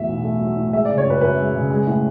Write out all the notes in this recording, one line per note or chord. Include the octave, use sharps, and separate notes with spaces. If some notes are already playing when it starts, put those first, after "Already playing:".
Already playing: E2 A2 F#3 E5
B1
A3
F#3
A2
G#3 E5
D5
C#3
C#5
F#2 B4
F#2 B4
G#3
C#3
G#3
A2